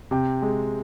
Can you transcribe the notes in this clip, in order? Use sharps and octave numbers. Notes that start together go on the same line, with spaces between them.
C3 G5
G#3